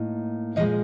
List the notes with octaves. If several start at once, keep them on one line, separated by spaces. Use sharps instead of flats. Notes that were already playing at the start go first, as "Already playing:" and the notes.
Already playing: A2 A#3 D#4
A#2 F3 G#3 D#5